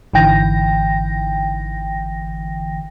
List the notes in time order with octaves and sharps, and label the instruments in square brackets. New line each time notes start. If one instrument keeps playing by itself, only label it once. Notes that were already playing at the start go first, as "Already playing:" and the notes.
[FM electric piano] G#1 D3 E3 G5 A#6